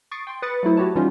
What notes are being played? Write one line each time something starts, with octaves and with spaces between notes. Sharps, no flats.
C#6 D#6 A6 C7 D7
G5 C6
B4 D#6 A6 C#7
F#3 A3 E4 C5
E4 F#4 G4 C#5 A5
E3 G3 C#4 D#4 F4 F#4